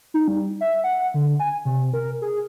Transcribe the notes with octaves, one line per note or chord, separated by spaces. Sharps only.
D#4
G3
E5
F#5
D3
G#5
C3
A#4
G#4